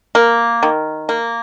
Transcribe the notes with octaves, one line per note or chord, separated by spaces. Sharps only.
A#3
D#3
A#3